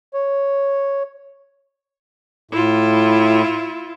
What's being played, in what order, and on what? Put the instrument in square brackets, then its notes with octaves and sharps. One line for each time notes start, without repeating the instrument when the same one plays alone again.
[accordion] C#5
[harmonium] A2 [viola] E4 F4